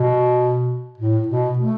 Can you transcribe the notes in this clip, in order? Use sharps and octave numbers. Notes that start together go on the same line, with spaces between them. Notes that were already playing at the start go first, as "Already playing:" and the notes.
Already playing: B2
A2
B2
A3